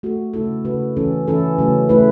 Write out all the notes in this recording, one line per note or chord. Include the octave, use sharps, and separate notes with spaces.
A3 F#4 A4
C#3 A3 E4 A4
C#3 A3 F#4 B4
E3 C#4 A4
E3 C#4 E4 A4
C#3 F#3 A3
A3 E4 B4